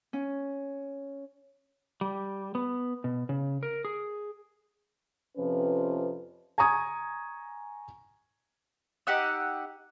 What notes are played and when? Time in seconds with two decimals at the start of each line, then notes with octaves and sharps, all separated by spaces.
0.13 C#4
2.01 G3
2.55 B3
3.04 B2
3.29 C#3
3.63 A#4
3.85 G#4
5.38 F2 C3 F3 C#4 B4
6.58 G#5 A#5 C#6 D#6 G#6
9.07 D#4 G4 F#5 E6